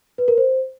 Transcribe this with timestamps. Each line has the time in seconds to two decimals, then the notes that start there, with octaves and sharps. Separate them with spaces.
0.18 B4
0.28 A#4
0.38 C5